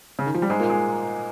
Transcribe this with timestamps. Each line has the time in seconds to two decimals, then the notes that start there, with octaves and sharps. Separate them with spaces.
0.19 C#3
0.26 D#3
0.34 F3
0.42 G3
0.49 G#2 G#3
0.60 A#2 A#3
0.70 G#3